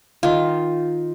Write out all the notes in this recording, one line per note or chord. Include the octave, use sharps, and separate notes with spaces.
D#3 F4